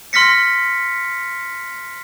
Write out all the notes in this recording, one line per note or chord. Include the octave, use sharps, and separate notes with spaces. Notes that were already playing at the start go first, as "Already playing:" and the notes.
C6 F6 A#6 B6 C#7